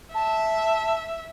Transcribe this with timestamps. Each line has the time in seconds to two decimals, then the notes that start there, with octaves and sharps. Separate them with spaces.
0.15 E5 A5